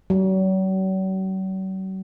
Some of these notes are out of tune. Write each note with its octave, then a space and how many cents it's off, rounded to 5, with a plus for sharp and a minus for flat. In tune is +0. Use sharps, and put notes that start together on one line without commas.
F#3 +45